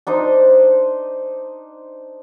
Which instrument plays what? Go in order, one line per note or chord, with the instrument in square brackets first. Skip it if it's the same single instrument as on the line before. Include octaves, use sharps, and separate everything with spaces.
[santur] D4 D#4 C5